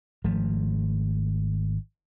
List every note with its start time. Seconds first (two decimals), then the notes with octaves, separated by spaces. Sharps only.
0.24 G#1 F3 A3